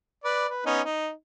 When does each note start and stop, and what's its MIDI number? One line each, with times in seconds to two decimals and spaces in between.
0.24 0.48 71
0.24 0.48 74
0.49 0.61 71
0.66 0.81 59
0.66 0.81 61
0.66 0.81 63
0.85 1.11 63